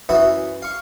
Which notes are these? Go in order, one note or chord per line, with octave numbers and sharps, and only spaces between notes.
F#2 E3 F#4 B4 E5 D#6
F5 C#6